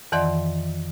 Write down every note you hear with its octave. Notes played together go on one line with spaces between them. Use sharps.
F2 D#3 E3 D5 F#5 C6